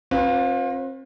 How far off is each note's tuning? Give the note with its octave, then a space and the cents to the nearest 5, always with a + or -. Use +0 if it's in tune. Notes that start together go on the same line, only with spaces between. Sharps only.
C4 +40 F4 +25 B4 -5